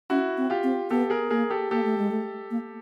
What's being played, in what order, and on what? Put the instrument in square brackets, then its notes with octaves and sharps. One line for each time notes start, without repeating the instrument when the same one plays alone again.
[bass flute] C#4 [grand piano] E4 F#4
[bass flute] C4
[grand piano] F4 G4
[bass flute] C4
[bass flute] B3 [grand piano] G4 A4
[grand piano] G#4 A#4
[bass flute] A#3 [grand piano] G#4 A#4
[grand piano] G4 A4
[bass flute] A#3 [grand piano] G4 A4
[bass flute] A3
G#3
A3
A#3